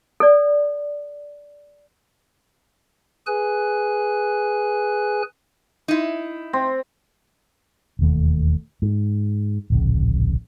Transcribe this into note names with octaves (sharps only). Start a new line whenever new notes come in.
A4 D5
G#4 B4 G#5 F#6
D#4 E4
C4
E1 D#2 A3
G#2
D1 A#1 C#3